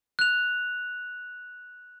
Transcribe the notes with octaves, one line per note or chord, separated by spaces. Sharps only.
F#6 F7